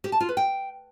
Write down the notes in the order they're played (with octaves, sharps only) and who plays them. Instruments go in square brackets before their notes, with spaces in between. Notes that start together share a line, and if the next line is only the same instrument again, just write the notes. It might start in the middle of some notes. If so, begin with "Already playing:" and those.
[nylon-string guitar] G4
A5
F4
B4
G5